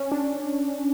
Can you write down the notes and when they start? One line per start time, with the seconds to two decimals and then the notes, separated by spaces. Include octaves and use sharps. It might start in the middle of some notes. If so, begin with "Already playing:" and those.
Already playing: C#4
0.12 D4